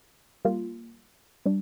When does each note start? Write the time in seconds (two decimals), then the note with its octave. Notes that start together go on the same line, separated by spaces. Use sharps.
0.45 G3 A#3 F4
1.46 G3 D4